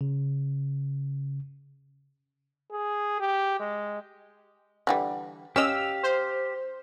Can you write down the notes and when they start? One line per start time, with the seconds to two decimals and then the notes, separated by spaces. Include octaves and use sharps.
0.01 C#3
2.72 G#4
3.20 G4
3.60 G#3
4.87 D3 E3 G3
5.56 C#4 G4 D#5 F5 E6
6.03 C5